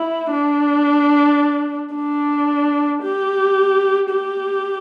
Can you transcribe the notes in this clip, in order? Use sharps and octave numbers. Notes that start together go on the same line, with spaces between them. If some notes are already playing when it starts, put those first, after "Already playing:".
Already playing: E4
D4
D4
G4
G4